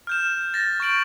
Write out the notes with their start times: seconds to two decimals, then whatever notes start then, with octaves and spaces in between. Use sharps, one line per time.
0.07 F6 G6 E7
0.54 A6 A#6
0.80 C#6 G6 D7 F#7